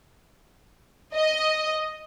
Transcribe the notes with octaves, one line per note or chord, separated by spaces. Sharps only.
D#5